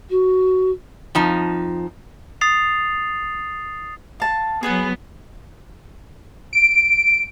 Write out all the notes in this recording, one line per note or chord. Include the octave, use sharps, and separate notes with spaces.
F#4
F2 F3 D#4
D#6 A6 C7 F7
F5 A5
F#3 B3 G#4 B4 B5
D7